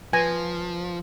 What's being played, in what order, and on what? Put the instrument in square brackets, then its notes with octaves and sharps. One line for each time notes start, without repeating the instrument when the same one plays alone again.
[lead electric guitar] F3 [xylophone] B4 A#6 [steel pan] G#5